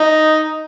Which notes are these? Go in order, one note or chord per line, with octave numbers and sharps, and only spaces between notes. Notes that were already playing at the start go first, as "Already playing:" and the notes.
Already playing: D#4